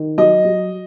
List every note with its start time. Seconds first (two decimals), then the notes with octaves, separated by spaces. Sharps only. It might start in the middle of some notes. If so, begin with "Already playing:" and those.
Already playing: D#3
0.18 F#3 D#5
0.45 F#3